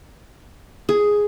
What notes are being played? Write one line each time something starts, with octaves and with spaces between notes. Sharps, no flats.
G#4